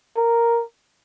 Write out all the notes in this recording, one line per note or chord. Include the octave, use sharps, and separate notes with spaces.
A#4